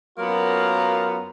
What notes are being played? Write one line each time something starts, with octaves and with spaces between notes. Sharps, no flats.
F#2 F#3 A#3 B3 F4 A#5